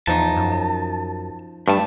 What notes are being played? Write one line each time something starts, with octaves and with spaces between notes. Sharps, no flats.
E2 F3 D#4 A5
F#2
G2 A3 A5